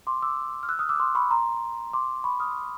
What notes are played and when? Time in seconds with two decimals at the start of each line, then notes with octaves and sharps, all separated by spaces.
0.07 C6 D6
0.22 D6 E6
0.63 F6
0.69 E6 F#6
0.79 D#6 F6
0.89 D6 E6
1.00 C6 D6
1.15 B5 C#6
1.31 A#5 C6
1.93 C6 D6
2.24 B5 C#6
2.40 D#6 F6